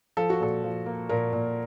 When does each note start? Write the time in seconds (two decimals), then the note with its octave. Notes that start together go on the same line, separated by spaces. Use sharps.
0.17 F3 A4
0.30 F#4
0.40 A#2 A4
0.64 F3
0.86 A#3
1.09 A#2 A#4
1.33 A#2